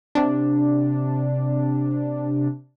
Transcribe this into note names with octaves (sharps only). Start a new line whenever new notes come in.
C3 D4